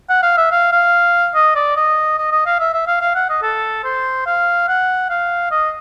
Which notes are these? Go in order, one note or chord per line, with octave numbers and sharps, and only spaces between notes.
F#5
F5
E5
F5
F5
D#5
D5
D#5
D#5
D#5
F5
E5
E5
F5
F5
F#5
D#5
A4
C5
F5
F#5
F5
D#5